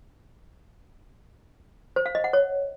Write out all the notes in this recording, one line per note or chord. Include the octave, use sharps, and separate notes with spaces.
C5
F5
D#5
F#5
C#5